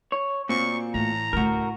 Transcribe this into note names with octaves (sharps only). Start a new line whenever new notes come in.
C#5
A#2 C4 F#4 D5 C#6
A2 E3 A#5
D2 A3 F#4 A#4